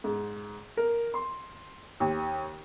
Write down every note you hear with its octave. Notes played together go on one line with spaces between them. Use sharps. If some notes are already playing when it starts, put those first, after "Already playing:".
G#2
A#4
C6
D#2